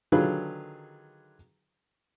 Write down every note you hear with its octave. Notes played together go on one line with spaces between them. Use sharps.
D3 D#3 F#3 F4 G#4 B4